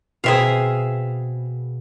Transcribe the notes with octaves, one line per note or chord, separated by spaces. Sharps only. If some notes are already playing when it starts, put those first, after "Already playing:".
B2 A#3 C4 G#4 B4 E5 F5